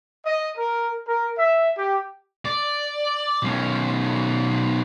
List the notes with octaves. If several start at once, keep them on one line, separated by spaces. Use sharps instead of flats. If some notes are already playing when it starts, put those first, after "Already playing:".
D#5
A#4
A#4
E5
G4
D5
B1 C#4